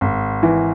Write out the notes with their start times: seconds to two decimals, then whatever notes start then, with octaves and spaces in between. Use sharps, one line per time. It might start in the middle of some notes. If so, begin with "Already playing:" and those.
0.01 G#1
0.43 E3